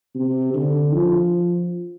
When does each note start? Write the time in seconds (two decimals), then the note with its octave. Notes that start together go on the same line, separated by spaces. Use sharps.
0.15 C3
0.54 D3
0.93 F3